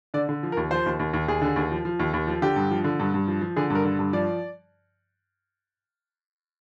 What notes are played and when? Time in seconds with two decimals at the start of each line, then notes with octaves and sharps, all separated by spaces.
0.14 D3 D5
0.29 D3
0.43 F3
0.52 A#4
0.57 D#2
0.71 F3 C5
0.86 D#2
0.99 D#2
1.13 D#2
1.28 D#2 G#4
1.42 D3
1.56 D#2
1.71 F3
1.85 F3
1.99 D#2
2.13 D#2
2.27 F3
2.42 D3 G4
2.56 G2
2.71 F3
2.84 D3
3.00 G2
3.14 G2
3.28 F3
3.41 F3
3.56 D3 G#4
3.70 G2 A#4
3.85 D3
3.99 G2
4.13 F3 D5